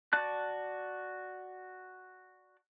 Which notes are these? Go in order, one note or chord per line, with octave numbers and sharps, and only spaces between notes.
F#4 D5 A5 F#6